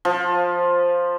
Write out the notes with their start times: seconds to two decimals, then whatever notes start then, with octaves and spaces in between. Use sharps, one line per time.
0.05 F3